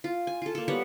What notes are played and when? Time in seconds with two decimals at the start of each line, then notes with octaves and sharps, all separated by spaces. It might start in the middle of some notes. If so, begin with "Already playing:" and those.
0.04 F4
0.27 G#5
0.42 F4 A4
0.55 A#3 A4
0.68 G3 B3 C#5 F#5